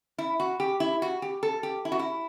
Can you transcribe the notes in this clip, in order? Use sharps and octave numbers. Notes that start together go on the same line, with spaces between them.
E4
F#4
G4
E4
F#4
G4
A4
G4
E4
F#4
E4